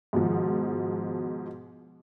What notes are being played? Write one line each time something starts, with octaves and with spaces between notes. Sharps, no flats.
G#2 B2 D#3 F3